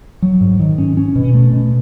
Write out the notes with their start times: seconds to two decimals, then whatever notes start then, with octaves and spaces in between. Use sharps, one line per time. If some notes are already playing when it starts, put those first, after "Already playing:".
0.22 F#3
0.41 G#2
0.60 D#3
0.78 C#4
0.97 C#4
1.16 B2
1.34 A3
1.53 B2